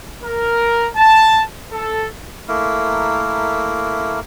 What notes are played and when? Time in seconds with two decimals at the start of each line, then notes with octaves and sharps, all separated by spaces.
0.23 A#4
0.96 A5
1.72 A4
2.48 A3 A#3 E4 A#4